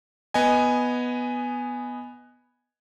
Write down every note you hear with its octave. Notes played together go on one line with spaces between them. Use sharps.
B3 D#5 G#5